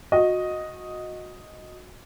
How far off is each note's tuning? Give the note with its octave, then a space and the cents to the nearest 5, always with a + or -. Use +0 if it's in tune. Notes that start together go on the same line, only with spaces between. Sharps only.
F#4 -25 D#5 +0